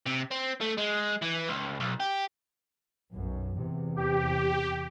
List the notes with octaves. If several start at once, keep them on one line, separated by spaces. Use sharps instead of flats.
C3
C4
A3
G#3
E3
C#2
B1
G4
B1 F#2
E2 C3
G4